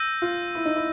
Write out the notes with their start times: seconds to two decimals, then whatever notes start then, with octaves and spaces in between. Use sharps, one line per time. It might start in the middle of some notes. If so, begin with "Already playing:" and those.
Already playing: E6 G6 A#6 D#7
0.22 F4
0.55 E4
0.65 D#4
0.76 E4